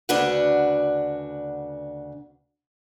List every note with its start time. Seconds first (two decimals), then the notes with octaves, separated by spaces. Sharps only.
0.09 D2 C#3 D4 F#4 B4 F#5